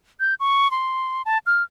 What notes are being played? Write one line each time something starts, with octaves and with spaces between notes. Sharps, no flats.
G6
C#6
C6
A5
F6